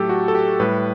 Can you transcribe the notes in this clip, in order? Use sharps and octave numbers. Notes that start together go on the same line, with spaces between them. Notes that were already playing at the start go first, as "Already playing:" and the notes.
Already playing: A2 F#3 A3 G4 A4
F#4
A4
G4
A2 G3 B4